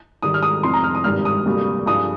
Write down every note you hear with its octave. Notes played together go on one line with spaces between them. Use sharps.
G#1 G#2 D#3 G3 D#6
F6
D#6
F1 F2 C3 C6
A#5
F6
D#6
G#1 G2 D#3 G3 F6
D#6
D2 C3 G3 A#3
G2 F3 G#3 D#6